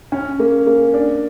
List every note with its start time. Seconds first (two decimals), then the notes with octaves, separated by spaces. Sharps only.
0.12 C#4
0.39 A#3
0.67 A#3
0.94 D4